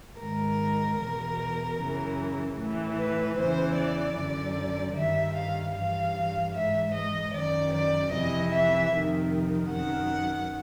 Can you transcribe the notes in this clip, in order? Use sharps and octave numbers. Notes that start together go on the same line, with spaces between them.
G#2 D#3 A#4
E2 B2
F#2 C#3 E3
A2 E3
B4
E2 C#3 E3 C5
D5
F#2 D3
G2 D#3 E5
F5
G2 E3 F5
G#2 E3 E5
D#5
F#2 D#3 D5
D5
F2 C3 E3 D#5
E5
F2 C3 D#3
F#2 D#3 F#5